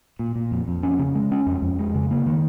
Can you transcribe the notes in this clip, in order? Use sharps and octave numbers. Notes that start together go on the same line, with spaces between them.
A#2
A#2
F2
F2
C#4
C#3
G#3
C#4
F2
F2
G#3
C#3
A#3
D#3